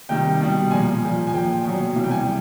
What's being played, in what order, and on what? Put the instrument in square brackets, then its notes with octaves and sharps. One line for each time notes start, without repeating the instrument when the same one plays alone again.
[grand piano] C3 D#3 G3 G5
B2 G3
A#2 F3 G#5
A#2 F3
G#5
A#2 F3 G5
B2 F#3
C3 E3 G3
G5
G#5